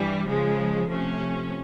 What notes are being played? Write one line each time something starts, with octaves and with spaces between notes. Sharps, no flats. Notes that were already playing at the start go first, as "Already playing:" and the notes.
Already playing: G2 E3 G3
C#3 F3 G#3
C3 F3 A3 C#4